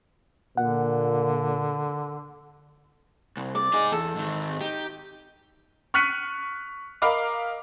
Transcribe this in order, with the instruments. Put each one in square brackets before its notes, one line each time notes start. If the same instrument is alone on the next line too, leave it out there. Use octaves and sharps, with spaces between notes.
[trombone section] A#2 [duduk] D3 [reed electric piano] F#5
[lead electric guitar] C2
[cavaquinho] D5
[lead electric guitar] D#4 G#4
[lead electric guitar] E2 [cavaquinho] A4
[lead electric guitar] G#2 D#3
[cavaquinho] D#4 [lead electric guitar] G4
[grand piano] C#6 F6 F#6 B6 C#7 D#7
A#4 D#5 F5 B5 D6